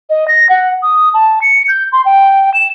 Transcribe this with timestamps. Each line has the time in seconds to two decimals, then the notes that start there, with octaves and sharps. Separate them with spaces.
0.10 D#5
0.28 A#6
0.49 F#5
0.83 D#6
1.14 A5
1.41 C#7
1.68 G6
1.92 C6
2.05 G5
2.54 E7